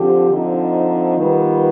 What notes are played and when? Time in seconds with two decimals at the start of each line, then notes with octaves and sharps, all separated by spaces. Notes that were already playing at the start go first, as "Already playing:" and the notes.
Already playing: D3 F3 C4 G4
0.31 D3 F3 C4 D#4
1.18 D#3 G3 B3 F4 B4